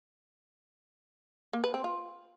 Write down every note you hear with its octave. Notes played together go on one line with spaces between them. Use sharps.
A#3
B4
C4
F4